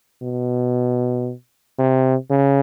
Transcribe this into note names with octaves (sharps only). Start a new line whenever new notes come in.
B2
C3
C#3